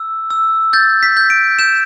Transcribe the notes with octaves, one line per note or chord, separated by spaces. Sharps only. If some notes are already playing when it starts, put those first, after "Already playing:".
Already playing: E6
E6
G6 A6
B6
G6
D7
G6 E7